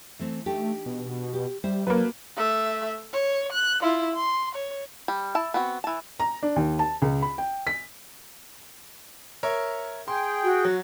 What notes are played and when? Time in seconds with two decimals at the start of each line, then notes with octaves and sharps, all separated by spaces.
0.19 E3 A3 C4
0.46 A3 D4 D#4 G4
0.86 B2
1.33 G4
1.64 G3 C5 E5
1.87 F#3 A#3 F#4 A4 B4
2.36 A3 E5
3.13 C#5
3.52 F#6
3.82 E4 F4
4.15 C6
4.55 C#5
5.08 G3
5.35 E4 A5
5.54 B3 C4 F#4
5.84 E3 A5
6.20 A#5
6.43 D4
6.56 D#2
6.79 A5
7.02 C#2
7.22 B5
7.38 G5
7.67 B6
9.43 A#4 C#5 E5
10.08 G#4 G5 C6
10.44 F#4
10.65 F#3